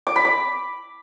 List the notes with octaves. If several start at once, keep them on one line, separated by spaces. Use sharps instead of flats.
D6
B5
D6